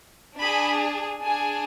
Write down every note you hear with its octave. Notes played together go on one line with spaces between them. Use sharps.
D4 G#4 B5
D4 G#4 G#5